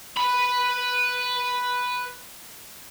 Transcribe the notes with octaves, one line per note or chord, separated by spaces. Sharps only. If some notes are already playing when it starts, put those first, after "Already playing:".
B4 B5